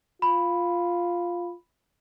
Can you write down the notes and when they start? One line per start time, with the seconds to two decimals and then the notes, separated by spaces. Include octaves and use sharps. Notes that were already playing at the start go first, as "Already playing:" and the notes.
0.22 F4 B5